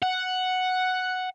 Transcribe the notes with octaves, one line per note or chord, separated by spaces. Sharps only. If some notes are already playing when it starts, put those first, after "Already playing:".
F#5